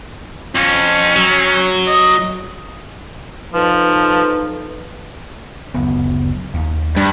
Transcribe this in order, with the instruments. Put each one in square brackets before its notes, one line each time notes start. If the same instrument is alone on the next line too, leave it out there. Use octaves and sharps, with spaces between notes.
[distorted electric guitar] F2 [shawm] C#4
[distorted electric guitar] F#3
[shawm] D#5
[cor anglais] F3 [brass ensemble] D#4 A4 B4
[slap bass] F#1 D2 B3
D#2
[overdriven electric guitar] G2